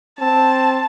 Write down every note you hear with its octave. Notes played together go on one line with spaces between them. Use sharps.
C4 A5